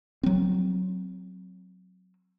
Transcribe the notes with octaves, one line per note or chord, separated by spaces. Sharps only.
F#3 C4